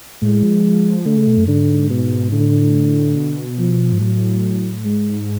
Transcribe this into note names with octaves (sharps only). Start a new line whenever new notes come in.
A2 G#3
F3
D3 A3
C#3
B2
F#2
G#2 D3
B2
A2 D3
B2
F3
G#2
A2 F#3
G#2 G#3